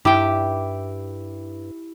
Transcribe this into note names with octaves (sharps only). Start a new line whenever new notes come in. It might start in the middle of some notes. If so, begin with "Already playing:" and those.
G2 E4 G4 G5 D6